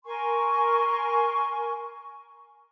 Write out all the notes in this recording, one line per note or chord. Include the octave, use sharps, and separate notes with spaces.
A#4 G#5 C6 C#6